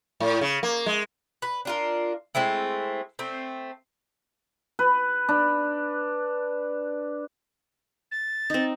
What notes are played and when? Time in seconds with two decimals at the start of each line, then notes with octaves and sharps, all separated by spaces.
0.20 A2
0.41 C#3
0.63 A#3
0.86 G#3
1.42 B4
1.65 D4 F4 A#4
2.35 G#3 A3 C4 E4
3.19 A3 C4
4.79 B4
5.29 D4
8.11 A6
8.50 C4 D#4